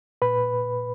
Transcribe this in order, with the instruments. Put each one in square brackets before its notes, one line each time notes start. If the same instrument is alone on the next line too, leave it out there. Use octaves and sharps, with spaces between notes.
[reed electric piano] A#2 B4 B5